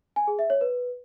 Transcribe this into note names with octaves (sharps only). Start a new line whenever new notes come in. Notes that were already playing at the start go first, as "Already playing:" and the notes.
G#5
G#4
E5
C#5
B4